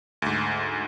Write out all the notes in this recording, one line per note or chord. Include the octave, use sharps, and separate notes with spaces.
D2 G#2